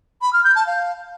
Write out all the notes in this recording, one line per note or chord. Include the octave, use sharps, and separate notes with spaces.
B5
F6
G6
A5
F5